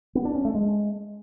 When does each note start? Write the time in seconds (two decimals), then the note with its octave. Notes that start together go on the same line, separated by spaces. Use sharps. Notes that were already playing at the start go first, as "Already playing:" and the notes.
0.15 B3
0.25 D4
0.35 C#4
0.45 A3
0.55 G#3